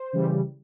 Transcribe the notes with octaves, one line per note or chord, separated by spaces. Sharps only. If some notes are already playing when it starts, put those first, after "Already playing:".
Already playing: C5
C#3 E3 G3